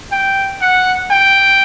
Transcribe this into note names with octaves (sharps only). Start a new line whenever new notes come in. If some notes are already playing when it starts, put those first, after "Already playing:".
G5
F#5
G5